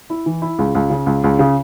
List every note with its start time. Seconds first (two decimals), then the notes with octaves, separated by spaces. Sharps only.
0.10 E4
0.26 E3
0.42 E4
0.59 C#2
0.75 C#2
0.90 C#3
1.06 C#2
1.24 C#2
1.39 C#3